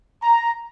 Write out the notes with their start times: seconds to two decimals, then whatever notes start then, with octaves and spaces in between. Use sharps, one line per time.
0.23 A#5